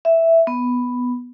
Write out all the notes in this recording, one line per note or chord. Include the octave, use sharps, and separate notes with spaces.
E5
B3